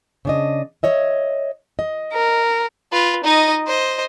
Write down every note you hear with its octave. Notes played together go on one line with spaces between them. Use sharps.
C#3 D4 D#5
C#5 D#5 E5
D#5
A#4
F4 B4
D#4 D#5
C5 D#5